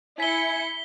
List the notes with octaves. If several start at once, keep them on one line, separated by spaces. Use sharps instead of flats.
E4 G#5 B6 C#7 G7